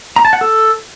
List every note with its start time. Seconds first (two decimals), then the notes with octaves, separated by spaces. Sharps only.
0.16 A#5
0.25 A5
0.33 F#5
0.41 A4